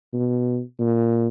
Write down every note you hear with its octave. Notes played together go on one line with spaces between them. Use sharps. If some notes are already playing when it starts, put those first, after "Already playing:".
B2
A#2